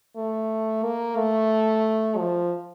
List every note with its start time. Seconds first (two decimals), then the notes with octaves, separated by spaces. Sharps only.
0.16 A3
0.83 A#3
1.16 A3
2.18 F3